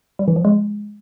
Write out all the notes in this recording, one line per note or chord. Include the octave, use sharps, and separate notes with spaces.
G3
E3
F3
G#3